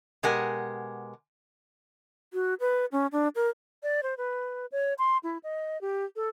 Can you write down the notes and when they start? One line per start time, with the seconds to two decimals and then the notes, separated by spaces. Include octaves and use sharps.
0.23 B2 G#3 G4 A#4 F#5 G#5
2.33 F#4
2.60 B4
2.92 C#4
3.12 D4
3.36 A#4
3.83 D5
4.03 C5
4.18 B4
4.72 C#5
4.99 C6
5.23 E4
5.43 D#5
5.81 G4
6.16 A4